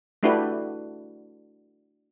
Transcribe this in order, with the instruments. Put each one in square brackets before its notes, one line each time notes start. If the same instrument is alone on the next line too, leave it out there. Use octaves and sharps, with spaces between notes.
[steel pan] A3 D4 E4 F#4 G4 B4